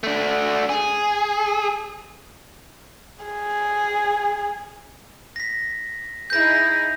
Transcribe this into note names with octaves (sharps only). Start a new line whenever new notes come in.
A3 D4
G#4
G#4
A#6 B6
D#4 E4 G#4 G6 A#6